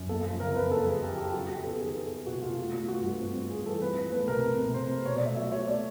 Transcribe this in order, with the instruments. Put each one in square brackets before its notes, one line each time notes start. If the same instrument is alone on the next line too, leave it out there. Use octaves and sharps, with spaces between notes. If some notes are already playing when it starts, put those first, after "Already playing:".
Already playing: [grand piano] F#2
A#3 A4
F3
C#3 A#4
F2 B4
A#3 A4
F3 G#4
C#3 G4
F3 G4
F#3 F#4
F#3 G4
B3 A4
D#3 G#4
B3 A4
B3
C3 F#4
C3 F4
A3 F#4
A3 F4
G2 F#4
G2
C4
C4
G2 G#4
E3 A4
C4 B4
F3
A3 B4
C3 A#4
C4
C3
C4 C5
C4
B2 C#5
D5
A3
E5
F#3 E5
F#3 C#5
A3 D5